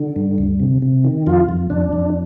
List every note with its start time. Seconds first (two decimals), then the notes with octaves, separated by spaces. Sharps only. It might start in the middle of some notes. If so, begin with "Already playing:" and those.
Already playing: D3
0.16 G2
0.38 D2
0.60 C3
0.82 C3
1.04 D#3
1.26 F2 F4
1.49 F2
1.70 F2 D4
1.93 F2